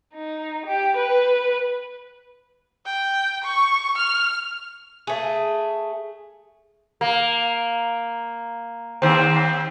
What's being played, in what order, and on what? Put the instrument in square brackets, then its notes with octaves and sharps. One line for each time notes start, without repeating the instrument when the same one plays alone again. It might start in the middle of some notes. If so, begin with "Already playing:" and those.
[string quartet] D#4
G4
B4
[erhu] G5
C#6
F6
[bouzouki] A3 G#4
[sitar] A#3
D#2 C4